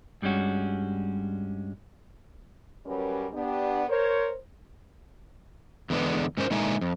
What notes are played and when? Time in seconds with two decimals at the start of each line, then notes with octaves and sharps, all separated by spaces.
0.22 G2 G3 G#3 C#4 F#4
2.85 F#2 G3 C#4 G4 A#4 B4
3.32 B3 D4 G4
3.88 A#4 C5 C#5
5.90 E2 D3 G#3 B3
6.37 G#2 C#4 A#4 C5
6.50 A#2 D3 G#3 D#4 E5 G#5
6.81 F2